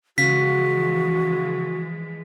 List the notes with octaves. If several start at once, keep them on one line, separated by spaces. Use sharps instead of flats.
C#3 E3 F3 G#3 F#4 F5 B6